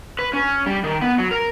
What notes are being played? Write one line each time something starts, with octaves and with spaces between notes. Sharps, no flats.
B4
C#4
G3
D#3
B3
F#3
A#4